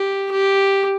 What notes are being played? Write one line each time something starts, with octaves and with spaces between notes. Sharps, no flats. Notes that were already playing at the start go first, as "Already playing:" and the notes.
Already playing: G4
G4